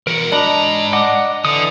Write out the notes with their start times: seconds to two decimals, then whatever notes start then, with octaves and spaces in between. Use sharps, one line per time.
0.07 E3 F#4 A#4
0.32 G#2 D4 D#5 A#5 B5
0.93 D#5 F#5 D6
1.45 D3 E3 D#6